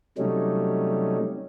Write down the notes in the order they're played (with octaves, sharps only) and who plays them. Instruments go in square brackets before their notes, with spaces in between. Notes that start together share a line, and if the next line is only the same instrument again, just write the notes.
[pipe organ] C3 F#3 G3 A3 C#4 D#4